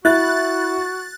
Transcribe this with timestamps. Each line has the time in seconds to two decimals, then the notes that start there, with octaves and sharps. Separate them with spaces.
0.05 E4 F#4 F#6 A6